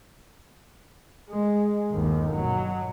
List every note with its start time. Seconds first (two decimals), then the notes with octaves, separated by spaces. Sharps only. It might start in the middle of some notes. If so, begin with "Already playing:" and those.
1.30 G#3
1.91 G1 D#2
2.35 B2 F#3